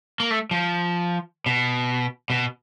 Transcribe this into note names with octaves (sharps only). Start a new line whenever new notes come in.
A#3
A3
F3
B2
B2